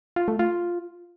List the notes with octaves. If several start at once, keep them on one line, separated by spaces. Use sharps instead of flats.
F4
A3
F4